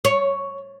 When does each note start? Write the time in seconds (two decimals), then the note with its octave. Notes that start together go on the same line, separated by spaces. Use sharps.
0.05 C#5